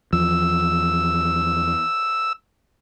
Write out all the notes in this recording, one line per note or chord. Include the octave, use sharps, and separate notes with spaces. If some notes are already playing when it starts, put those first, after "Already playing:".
E2 F3 E6